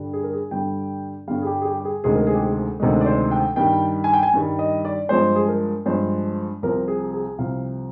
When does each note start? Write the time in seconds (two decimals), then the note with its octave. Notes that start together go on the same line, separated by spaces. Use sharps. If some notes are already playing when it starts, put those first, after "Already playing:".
Already playing: G2 D3 G3
0.13 G#4
0.23 A#4
0.33 G#4
0.51 G2 D3 G3 G5
1.27 G2 D3 G3 F5
1.42 G#4
1.46 G4
1.62 G#4
1.65 G4
1.80 G4
1.85 G#4
2.04 D2 C3 D#3 G#3 G#4
2.15 A#4
2.27 G#4
2.34 G4
2.42 G#4
2.80 D2 C3 D#3 G#3
3.01 D5
3.06 C5
3.31 G5
3.56 G2 D#3 G3 G5
4.04 G#5
4.13 G5
4.23 G#5
4.34 G2 D#3 G3
4.59 D#5
4.85 D5
5.09 G2 F3 G#3 C5
5.36 G#4
5.48 A#4
5.86 G2 F3 G#3 C5
6.63 C2 C3 F3 A#4
6.88 G#4
7.14 G#4
7.38 C2 C3 F3 F5